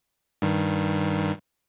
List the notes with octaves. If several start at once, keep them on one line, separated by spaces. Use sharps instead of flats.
G2 D#3